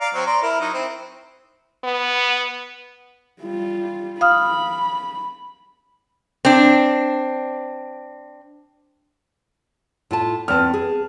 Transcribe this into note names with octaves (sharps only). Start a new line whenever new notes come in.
D5 F5 A#5
F#3 C4
D5 A#5 C6
E4 A#4
F#3 D#4
C4 E4
B3
G3 F4
F5 B5 D#6 F6
C4 D4
A2 F4 A5
E2 C4 B4 A5 F6
G#4